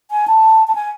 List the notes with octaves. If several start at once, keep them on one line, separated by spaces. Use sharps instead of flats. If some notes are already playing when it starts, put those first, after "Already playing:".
G#5
A5
A5
G#5